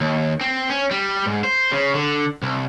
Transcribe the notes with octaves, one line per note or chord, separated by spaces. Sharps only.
D#2
C4
C#4
G3
G#2
C5
C#3
D3
C2